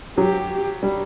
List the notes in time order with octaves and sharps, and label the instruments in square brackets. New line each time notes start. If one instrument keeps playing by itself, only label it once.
[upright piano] F#3 [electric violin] G4
[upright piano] G3